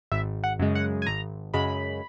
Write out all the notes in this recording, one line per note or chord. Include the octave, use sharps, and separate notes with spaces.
G#1 E5
F#5
F#2 C#3 G#3
F#5
G#5
G#1 A#5
F#2 C#3 G#3 B5